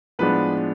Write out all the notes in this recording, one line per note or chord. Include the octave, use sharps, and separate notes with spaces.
A2 F3 G#3 B3 D4 B4